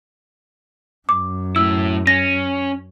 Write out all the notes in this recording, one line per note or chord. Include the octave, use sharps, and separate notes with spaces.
F#2 D6
A2 E4 E6
C#4 A#6